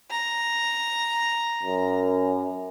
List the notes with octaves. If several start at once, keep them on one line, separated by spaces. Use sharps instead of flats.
A#5
F#2